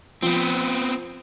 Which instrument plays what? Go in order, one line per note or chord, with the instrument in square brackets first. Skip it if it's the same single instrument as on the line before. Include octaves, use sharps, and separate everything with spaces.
[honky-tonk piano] F3 [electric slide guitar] B3 C4